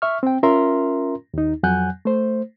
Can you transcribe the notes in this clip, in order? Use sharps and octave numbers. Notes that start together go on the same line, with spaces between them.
E5 C#6 F6
C4 G5
C#4 F4 A#4 E5 A#5 C6
D#2 D#4
F2 F#3 F#5 G#5 F#6 G6
A3 C5